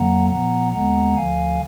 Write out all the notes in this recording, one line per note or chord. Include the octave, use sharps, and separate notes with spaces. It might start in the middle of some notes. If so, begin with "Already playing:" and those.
Already playing: F2 D3 F#3 A#3 F#5 A#5
A#2 F3 B3 F#5 A#5
D#2 D3 G#3 B3 F#5 A#5
D2 D3 F3 F5 G#5